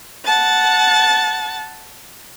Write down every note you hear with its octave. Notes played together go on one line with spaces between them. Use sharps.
F#5 A5 A6